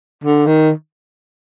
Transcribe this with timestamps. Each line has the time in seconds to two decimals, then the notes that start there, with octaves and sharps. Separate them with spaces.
0.24 D3
0.47 D#3